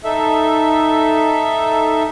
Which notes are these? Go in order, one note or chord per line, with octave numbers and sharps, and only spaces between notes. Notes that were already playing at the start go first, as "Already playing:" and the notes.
D#4 A4 E5